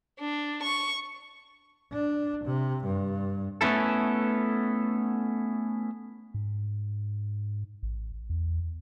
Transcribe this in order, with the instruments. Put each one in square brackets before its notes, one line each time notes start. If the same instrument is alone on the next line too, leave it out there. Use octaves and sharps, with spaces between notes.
[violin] D4
C#6
[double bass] D4
C3
G2
[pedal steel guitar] A3 B3 C#4 E4 A4
[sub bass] G#2
A1
E2